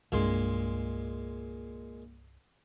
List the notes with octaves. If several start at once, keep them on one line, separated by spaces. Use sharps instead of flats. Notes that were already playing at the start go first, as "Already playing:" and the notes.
C2 G2 A#2 G#3 D4 C6